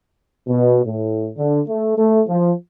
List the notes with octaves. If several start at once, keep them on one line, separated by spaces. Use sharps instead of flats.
B2
A2
D3
A3
A3
F3